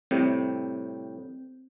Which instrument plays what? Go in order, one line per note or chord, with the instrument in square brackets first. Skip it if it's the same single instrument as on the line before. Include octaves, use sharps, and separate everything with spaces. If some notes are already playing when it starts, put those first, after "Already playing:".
[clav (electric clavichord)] A2 C3 G3 [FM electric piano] C4